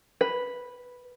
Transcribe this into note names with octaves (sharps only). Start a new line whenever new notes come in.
B4